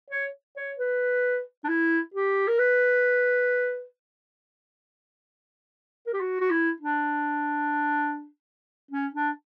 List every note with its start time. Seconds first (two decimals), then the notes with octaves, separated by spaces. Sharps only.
0.10 C#5
0.57 C#5
0.78 B4
1.64 D4
1.68 E4
2.14 G4
2.48 A#4
2.59 B4
6.07 A#4
6.13 G4
6.20 F#4
6.40 F#4
6.50 E4
6.80 D4
8.91 C#4
9.14 D4